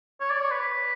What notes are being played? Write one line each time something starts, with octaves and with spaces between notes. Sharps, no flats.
C#5
D5
C#5
B4